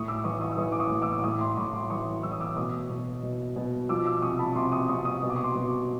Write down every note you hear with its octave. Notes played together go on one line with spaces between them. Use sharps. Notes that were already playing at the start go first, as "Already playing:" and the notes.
Already playing: A2 C#6 D#6
D6 E6
E3 C#6 D#6
C#6 D#6
E6
E3 C#6 D#6
D6
C#6 D#6
A2
D6 E6
D6
A2 C#6 D#6
C6 D6
A2 B5 C#6
C6 D6
E3 C#6 D#6
E3 E6
D#6
D6 E6
B2 C#6 D#6
B2
B2
B2
F3 D6 E6
D6 E6
C3 C#6 D#6
A5 B5
C3 C6 D6
C#6 D#6
C3 C#6 D#6
C#6 D#6
B2 D#6
D6
C#6
C6 D6
B2